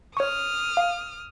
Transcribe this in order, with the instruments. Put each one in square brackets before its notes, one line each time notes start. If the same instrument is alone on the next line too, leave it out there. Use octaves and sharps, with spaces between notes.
[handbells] C#5 C#6 [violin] D#6 F6
[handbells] F5